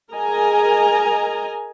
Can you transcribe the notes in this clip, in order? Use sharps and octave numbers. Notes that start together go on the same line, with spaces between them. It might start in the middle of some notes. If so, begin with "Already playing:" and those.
G#4 A#4 D#5 G#5 A#5